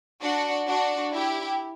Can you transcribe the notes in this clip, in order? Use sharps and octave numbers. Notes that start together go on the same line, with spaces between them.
D4 F#4
D4 F#4
E4 G4